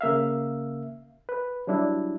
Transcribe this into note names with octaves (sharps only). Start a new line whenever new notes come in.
C#3 A#3 E5 F5
B4
F#3 G3 D4 E4